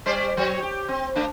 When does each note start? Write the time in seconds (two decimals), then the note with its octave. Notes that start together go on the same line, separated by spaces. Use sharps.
0.06 G3 C5 D5
0.37 F#3 C#5
0.62 G4
0.89 C4
1.16 A3 D4